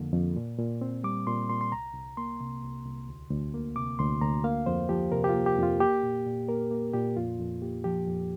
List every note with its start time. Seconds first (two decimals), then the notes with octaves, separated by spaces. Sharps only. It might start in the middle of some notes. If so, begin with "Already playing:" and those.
Already playing: F2 D3 A#3
0.13 F2
0.36 A#2
0.58 A#2
0.81 C4
1.04 G3 D6
1.27 A#2 C6
1.49 A#2 C6
1.61 C6
1.72 C2 A#5
1.94 C2
2.17 A#3 C6
2.40 C3
2.63 C2
2.85 C2
3.08 D2
3.31 D2
3.54 A#3
3.76 C3 D6
3.99 D2 C6
4.21 D2 A#5
4.44 A#3 F5
4.66 F2 C5
4.89 F3 G4
5.12 C3 A#4
5.24 G4
5.29 F4
5.34 A#3
5.46 G4
5.58 F2 F4
5.80 A#3 G4
6.03 A#2
6.26 A#2
6.48 A#3 A#4
6.71 A#3
6.94 A#2 G4
7.16 F2 F4
7.39 F2
7.62 A#3 G4
7.84 F3 G4
8.08 F2